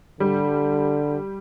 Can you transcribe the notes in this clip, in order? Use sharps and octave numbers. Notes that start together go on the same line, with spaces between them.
D3 G3